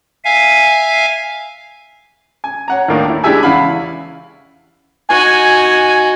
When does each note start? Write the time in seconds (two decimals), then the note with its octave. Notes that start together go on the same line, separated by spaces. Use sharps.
0.24 E5 F5 G#5
2.44 G#5
2.68 C#5 F#5 A#5
2.88 D#2 A2 D#3 A#3 D4
3.09 E4
3.24 G#3 D4 E4 G4 E5 G#5
3.43 E2 C#3 E4 F5 F#5 B5
5.09 D#4 F#4 G#5